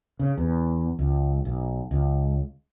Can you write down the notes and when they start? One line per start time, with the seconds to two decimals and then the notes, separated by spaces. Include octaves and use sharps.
0.19 C#3
0.37 E2
0.99 C#2
1.45 B1
1.91 C#2